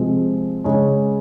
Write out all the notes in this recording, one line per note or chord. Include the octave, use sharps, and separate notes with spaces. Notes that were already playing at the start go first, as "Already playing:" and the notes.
Already playing: C3 F3 G#3 C4
C#3 G#3 C#4